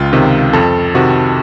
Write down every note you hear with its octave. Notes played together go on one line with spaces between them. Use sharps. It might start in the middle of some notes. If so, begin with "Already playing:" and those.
Already playing: C#2 F4
C3 D#3
F2 A4
C3 D#3 F#4